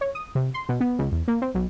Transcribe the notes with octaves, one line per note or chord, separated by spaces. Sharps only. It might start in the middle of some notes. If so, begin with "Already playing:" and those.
C#5
D#6
C3
C6
B2
B3
C#2
E2
A#3
C4
B1